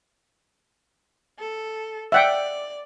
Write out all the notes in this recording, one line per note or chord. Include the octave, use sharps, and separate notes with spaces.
A4
D5 E5 F#5 G5